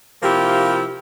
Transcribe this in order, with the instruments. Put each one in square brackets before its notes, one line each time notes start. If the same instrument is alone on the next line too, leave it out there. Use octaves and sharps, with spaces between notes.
[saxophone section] C3 F3 A#3 E4 F4 G4